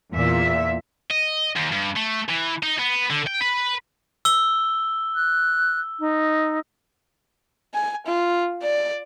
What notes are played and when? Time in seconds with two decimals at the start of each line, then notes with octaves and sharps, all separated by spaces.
0.12 E2 A#2 E5
1.11 D#5
1.56 D#2
1.72 G2
1.96 A3
2.29 E3
2.63 D#4
2.79 B3
3.10 D3
3.27 G5
3.41 B4
4.25 E6 G7
5.15 F#6
5.99 D#4
7.74 G#5
8.07 F4
8.63 D5